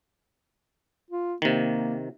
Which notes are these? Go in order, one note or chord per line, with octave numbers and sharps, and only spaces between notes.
F4
C3 D#3 A#3